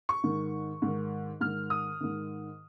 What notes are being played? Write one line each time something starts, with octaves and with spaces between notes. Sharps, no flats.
C#6
G#2 D#3
G#2 D#3
G#2 D#3 F6
D#6
G#2 D#3